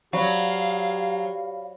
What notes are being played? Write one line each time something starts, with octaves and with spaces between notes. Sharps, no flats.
F#3 G4 C5 D5 F5 B5